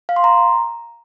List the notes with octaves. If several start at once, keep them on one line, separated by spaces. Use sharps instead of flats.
F5
C6
A#5